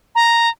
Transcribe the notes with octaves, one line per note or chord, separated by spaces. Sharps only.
A#5